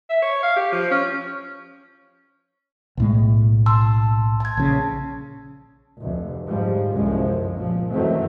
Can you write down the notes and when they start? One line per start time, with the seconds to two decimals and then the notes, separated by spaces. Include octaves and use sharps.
0.10 E5
0.22 C#5
0.43 F5
0.56 G4
0.72 F3
0.91 C#4
2.97 B1 A2 G#3
3.66 A5 C6 E6
4.40 A5 G#6
4.57 A#1 C#3
5.99 F1 D2
6.45 G#2 F3 G3
6.92 G1 C2 F#2 F3 G#3
7.53 A#2 F3
7.91 F#2 D#3 E3 F#3 A3 C4